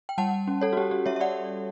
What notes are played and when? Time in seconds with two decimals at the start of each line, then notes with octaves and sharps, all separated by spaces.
0.09 G5
0.18 G3 F#5 A5
0.47 C#4
0.61 A4 C#5
0.73 F#4
0.77 C#4 G4
0.91 G4
1.06 G3 C#5 E5
1.16 E5
1.20 D5 F#5